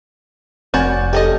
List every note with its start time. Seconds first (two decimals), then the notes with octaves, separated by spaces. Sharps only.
0.74 F1 C4 F#4 C#5 D5 G#5 G6 A6
1.13 A3 C#4 G4 A4 D#5